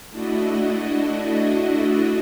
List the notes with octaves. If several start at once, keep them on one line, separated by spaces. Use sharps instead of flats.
A3 D4 E4 F#4 D#5